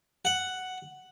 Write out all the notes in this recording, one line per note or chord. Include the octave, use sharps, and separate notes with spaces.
F#5